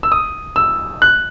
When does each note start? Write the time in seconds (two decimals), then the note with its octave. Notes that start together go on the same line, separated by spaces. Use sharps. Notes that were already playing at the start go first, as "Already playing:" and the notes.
0.03 E6
0.12 D#6
0.56 E6
1.02 F#6